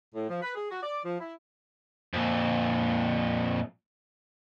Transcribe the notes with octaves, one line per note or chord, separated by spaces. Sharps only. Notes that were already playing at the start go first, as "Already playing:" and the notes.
A2
F3
B4
G#4
F#4
D5
F3
E4
F2 A#2